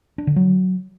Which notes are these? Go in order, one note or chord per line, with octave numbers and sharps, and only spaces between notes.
D4
D3
F#3